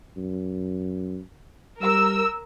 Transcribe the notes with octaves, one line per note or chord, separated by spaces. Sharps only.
F#2
G3 A#4 E6